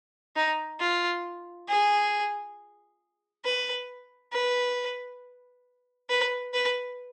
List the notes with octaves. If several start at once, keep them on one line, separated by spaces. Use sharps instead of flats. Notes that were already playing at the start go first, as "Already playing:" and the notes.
D#4
F4
G#4
B4
B4
B4
B4